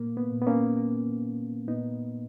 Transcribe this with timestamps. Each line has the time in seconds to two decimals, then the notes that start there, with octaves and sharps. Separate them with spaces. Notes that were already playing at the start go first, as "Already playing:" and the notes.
Already playing: A#2 A#3
0.17 B3
0.32 A#2
0.42 B3
0.47 A#3 C#4
0.77 A#3
1.22 A#3
1.67 A#2 B3 D#4